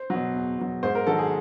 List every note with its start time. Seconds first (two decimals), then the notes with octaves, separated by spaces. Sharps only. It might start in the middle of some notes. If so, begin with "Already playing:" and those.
Already playing: C5
0.10 B2 F#3
0.34 E2
0.58 B2 F#3
0.83 G#2 C5
0.95 A#4
1.07 D#3 F#3 A4
1.19 G#4